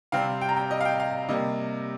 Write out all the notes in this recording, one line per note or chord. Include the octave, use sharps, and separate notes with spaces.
C3 G3 C4 F5
G5
A#5
G5
D#5
F5
G5
F5
C3 G3 A#3 D#5